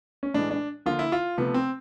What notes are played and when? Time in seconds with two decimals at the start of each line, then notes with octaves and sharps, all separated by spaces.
0.23 C#4
0.34 A2 E3 G#3 D4
0.51 D4
0.86 D3 F3 A#3 F4
0.99 E4
1.12 F4
1.37 C3 F3 A3 B3
1.54 C4